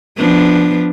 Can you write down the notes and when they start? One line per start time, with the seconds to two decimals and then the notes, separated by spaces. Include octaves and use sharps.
0.18 F3 B3 D4